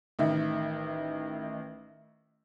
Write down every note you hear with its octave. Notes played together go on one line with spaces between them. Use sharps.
A1 D#3 E5